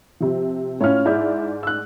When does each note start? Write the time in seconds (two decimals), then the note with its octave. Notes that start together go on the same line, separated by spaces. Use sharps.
0.20 C3 F3
0.81 A2 C#4 F4 C#5 F6
1.05 G#2 E4 D5 G6
1.63 E6 F#6